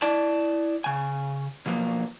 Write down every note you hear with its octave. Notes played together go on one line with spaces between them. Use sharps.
E4 D5 A5
C#3 G#5
B2 F3 F#3 A#3